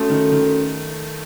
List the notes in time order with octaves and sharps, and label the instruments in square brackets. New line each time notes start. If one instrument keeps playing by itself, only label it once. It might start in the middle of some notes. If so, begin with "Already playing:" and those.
Already playing: [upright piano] A3 [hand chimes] C#4 F#4 A4
[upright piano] D#3
D#3